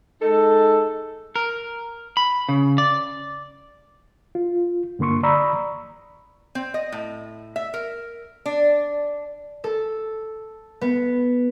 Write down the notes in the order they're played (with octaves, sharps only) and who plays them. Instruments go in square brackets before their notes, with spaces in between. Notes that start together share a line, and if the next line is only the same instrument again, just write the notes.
[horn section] G#3 D#4 A4
[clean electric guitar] A#4
B5
C#3
D5
[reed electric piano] F4
G2 D3 A#3 C6 C#6
D5 A#5 B5 C#6 D#6 E6
[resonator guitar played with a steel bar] C4
D#5
A2
E5
A#4
D4
[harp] A4
B3